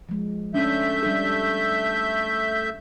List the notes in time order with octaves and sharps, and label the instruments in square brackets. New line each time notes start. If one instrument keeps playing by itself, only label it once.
[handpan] F3 G#3
[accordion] A3 E5 G6 [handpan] C#4 D4
[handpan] G3 D4 A4